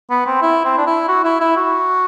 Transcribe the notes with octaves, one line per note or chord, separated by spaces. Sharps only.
B3
C4
E4
C4
D4
E4
F#4
E4
E4
F#4